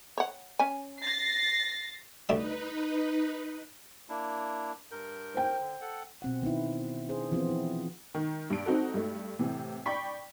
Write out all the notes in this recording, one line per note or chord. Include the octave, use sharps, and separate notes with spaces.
C#5 F#5
C#4 G#5
A6 A#6 C7
D2 G3 D#4 B4 E5
A#3 D4 E4
G2 A#4 G6
C5 G5
D3
A4 F#5
B2 C4 F#5
D#3 B3 D#4 E4
D4 G#4 C5
E3 F3 B3 C4 F4
E4
D#3
G2 D4 D7
C4 D#4 F#4 A4
G2 A3
A2 C3 E3
D5 G5 B5 C#6 B6